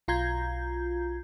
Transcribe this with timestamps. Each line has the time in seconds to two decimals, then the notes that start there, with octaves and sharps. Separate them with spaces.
0.08 B1 F4 A#5 G6 G#6